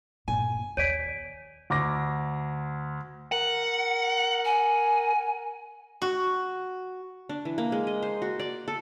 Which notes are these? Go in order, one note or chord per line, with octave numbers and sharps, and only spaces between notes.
G1 A#2 G#5
D#2 C#5 D5 B6 D7 D#7
D2 D6 A#6
A#4 F#5
G#5
F#4
D4
E3
A#3
G#3
D#5
C5
F#4
D5
A4